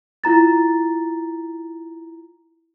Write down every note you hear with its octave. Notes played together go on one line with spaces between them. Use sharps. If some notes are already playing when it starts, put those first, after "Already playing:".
E4 F4 A#5 A6